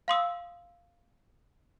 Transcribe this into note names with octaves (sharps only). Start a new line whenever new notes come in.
F5 C6 D#6 E6